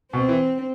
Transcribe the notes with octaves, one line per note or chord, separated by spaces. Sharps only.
B2 C4
E3